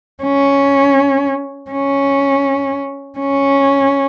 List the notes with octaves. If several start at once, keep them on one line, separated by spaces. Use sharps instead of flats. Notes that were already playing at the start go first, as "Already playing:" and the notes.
C#4
C#4
C#4